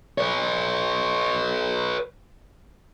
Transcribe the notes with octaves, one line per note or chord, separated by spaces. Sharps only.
B4 C#5